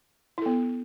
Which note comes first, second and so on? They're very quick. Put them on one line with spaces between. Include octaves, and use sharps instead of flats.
E4 A4 B3